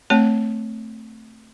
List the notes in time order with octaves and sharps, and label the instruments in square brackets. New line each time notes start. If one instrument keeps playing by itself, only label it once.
[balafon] A3 C4 C#5 A5